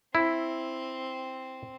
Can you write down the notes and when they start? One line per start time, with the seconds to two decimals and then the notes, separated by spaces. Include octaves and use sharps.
0.15 C4 E4